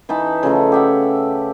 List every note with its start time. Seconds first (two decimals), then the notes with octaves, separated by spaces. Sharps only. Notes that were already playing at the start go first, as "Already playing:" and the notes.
0.09 E3 D#4 A5 B5
0.43 C#3 F3 A3 D#4
0.72 G4 E5 F#5